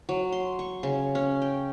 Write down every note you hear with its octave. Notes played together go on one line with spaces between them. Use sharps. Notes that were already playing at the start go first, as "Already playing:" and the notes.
F#3
C6
C#6
C#3
C#4
G5